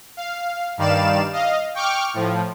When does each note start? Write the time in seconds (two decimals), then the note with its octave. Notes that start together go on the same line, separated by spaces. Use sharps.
0.17 F5
0.77 G2 D#3 G3 D5 F5 E7
1.33 D#5 F5
1.74 G5 C#6 D6 F6
2.14 A2 F3